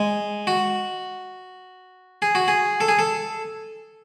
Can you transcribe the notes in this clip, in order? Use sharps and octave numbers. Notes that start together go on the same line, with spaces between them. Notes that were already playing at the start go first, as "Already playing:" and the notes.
Already playing: G#3
F#4
G#4
F#4
G#4
A4
G#4
A4